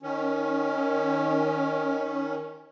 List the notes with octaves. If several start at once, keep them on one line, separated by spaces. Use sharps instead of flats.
D#3 C#4